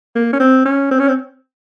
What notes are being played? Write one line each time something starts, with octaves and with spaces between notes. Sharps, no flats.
A#3
C#4
C4
C#4
C4
C#4
C4